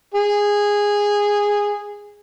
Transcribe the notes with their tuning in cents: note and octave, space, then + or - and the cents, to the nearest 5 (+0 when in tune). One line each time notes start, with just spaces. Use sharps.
G#4 -10